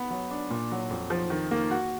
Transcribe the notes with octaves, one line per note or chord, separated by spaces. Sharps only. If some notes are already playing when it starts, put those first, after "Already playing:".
Already playing: B3
F#3
D4
A#2
F#3
F2
F3
D#3
A#3
F#4